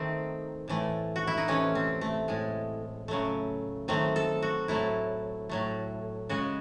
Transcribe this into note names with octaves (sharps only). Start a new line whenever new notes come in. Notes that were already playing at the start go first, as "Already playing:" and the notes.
Already playing: D#3 A3 C4
A2 E3 A3
F#4
E4
D#4
C3 E3 A3 C#4
C4
A3
A2 G#3
C#3 F#3 A3
D#3 F#3 A3 C4
A4
F#4
A2 F#3 A3 E4
A2 F#3 A3
C#3 G#3 F#4